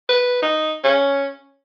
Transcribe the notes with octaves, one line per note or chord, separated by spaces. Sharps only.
B4
D#4
C#4